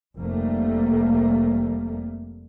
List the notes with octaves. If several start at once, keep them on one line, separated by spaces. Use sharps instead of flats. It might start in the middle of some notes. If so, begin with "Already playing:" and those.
F1 G3 A3 A#3